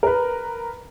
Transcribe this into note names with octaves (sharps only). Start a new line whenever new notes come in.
A#4 B4